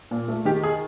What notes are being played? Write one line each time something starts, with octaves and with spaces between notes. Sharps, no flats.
A#2
A3
D#3 G4
G#4